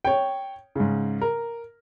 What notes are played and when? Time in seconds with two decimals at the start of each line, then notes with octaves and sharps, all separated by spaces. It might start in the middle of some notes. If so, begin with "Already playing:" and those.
0.05 C#5 G5
0.76 G#2 C#3
1.21 A#4